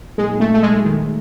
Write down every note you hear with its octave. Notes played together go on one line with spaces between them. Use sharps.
A#2 F#3 G#3 A#3 D#4 G#4
A3
A3
G#3
D#3